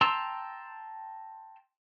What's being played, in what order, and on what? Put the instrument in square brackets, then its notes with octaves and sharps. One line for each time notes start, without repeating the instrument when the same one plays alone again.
[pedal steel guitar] G5 A5 A#5 C6 E6